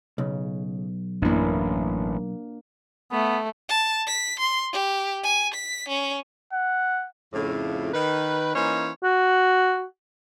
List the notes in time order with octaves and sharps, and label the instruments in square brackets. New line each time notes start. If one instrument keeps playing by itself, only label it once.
[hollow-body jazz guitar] B1 [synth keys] C#3
[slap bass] A1 [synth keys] F#2 E4 [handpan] A#3 D4
[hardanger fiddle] A3 [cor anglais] B3
[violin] A5
B6
C6
G4
G#5
B6
C#4
[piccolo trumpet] F#5
[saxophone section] F2 A2 C#3
D#3 B4
E3 A#3 C#4 D#4 C5 C#5
[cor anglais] F#4